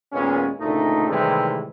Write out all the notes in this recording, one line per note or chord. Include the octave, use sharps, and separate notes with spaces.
D#2 A#2 G#3 B3 C#4
D2 A#2 C#3 A3 D#4
A2 C3 D#3 E3 G3 G#3